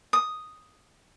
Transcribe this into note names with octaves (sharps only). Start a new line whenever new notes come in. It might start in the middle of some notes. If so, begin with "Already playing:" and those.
D#6